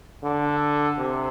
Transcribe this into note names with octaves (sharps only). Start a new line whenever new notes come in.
D3
C3